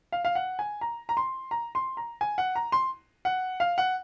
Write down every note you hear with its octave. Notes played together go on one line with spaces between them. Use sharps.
F5
F5
F#5
G#5
A#5
A#5
C6
A#5
C6
A#5
G#5
F#5
A#5
C6
F#5
F5
F#5